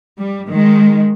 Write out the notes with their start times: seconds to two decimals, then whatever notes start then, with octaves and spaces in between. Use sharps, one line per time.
0.17 G3
0.49 D#3 G#3